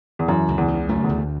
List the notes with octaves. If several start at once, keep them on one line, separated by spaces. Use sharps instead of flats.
E2
F#2 E3
C#2
E2
C#3
F#2 A3
E2
D2